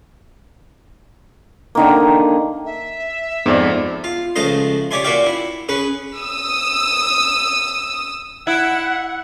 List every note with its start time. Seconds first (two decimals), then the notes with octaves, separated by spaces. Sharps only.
1.75 D3 D#3 A#3
2.65 E5
3.46 F2 G#2 B3 C5 D5
4.04 F4
4.36 C#2 F3 A3 F4 D#5 C6
4.91 G4 C#5 D5 E5 G#5 C6
5.04 A#2 F#4 D5 E5 F5 G5
5.26 E4
5.69 C#4 G#4 B4
6.17 D#6 E6
8.47 E4 F#5